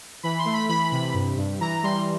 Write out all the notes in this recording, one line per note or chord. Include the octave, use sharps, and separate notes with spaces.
E3 B5
C6
A3
B5
E3 B5
C3 B5
G2
G2
E3 A#5
G3 C6